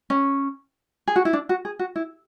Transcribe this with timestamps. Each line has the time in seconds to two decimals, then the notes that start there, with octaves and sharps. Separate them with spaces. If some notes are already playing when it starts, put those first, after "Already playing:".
0.10 C#4
1.07 G#4
1.16 F#4
1.25 E4
1.33 D4
1.49 F#4
1.65 G#4
1.79 F#4
1.96 E4